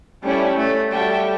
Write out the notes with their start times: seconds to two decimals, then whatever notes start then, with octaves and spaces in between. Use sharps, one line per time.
0.23 G3 A3 C#4 E4 G4 D5
0.57 A3
0.91 G3 F#4 A4 E5 G5